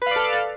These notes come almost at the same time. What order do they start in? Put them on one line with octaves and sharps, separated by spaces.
B4 F5 D5 A4